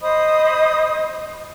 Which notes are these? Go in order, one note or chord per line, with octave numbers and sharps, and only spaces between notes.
C5 D#5 B5 D#6